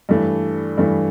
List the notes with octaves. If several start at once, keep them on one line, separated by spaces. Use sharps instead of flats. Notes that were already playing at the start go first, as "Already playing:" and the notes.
G2 E3 A3
G2 E3 A3